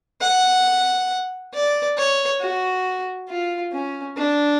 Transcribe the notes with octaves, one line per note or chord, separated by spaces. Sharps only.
F#5
D5
C#5
F#4
F4
C#4
D4